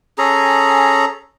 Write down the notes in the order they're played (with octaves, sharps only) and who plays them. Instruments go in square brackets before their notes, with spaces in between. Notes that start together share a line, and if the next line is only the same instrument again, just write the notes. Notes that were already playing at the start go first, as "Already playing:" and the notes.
[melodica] C#4 G#4 A4 A#5